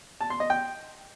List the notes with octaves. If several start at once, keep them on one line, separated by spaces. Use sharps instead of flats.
A5
C6
D#5
G5